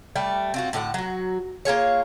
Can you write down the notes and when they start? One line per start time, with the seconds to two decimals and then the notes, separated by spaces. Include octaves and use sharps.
0.16 G3 A3 D5
0.54 C4 F4 F#4
0.73 A2 D3 E4 F#5
0.94 F#3 F#4
1.65 A#3 F4 G#4 C#5